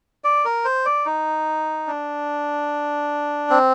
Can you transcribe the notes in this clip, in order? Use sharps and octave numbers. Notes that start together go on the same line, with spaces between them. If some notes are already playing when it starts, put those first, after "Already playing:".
D5
A#4
C5
D5
D#4
D4
C4